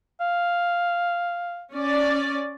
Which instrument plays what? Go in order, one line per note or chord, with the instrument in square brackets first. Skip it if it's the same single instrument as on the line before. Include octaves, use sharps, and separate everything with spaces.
[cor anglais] F5
[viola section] C#4 D5